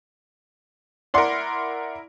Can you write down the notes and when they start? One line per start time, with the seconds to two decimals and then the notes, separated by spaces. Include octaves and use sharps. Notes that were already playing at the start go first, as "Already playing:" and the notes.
1.14 E4 A#4 D5 F#5 C6